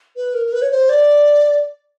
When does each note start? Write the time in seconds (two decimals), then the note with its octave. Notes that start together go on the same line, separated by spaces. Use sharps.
0.16 B4
0.34 A#4
0.46 A#4
0.52 B4
0.62 C#5
0.71 C5
0.89 D5